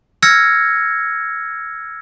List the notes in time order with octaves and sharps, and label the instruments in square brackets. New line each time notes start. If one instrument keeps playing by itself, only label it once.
[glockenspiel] E6 F6 G#6 A#6 C#7